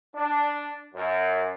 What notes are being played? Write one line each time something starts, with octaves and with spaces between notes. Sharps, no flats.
D4
F#2